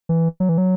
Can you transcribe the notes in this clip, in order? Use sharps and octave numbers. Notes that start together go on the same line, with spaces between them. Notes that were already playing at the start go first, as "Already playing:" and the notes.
E3
F#3
E3
F#3